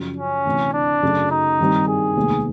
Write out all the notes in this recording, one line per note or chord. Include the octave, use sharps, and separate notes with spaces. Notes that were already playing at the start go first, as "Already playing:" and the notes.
Already playing: F#2 C#3 F3
C#4
D2 C3 E3
D4
F#2 C#3 F#3 A3
D#4
G2 D#3 G3 C4
G#4
F1 D#2 D#3 G#3 B3